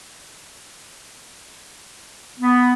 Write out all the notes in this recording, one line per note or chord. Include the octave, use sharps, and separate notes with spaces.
B3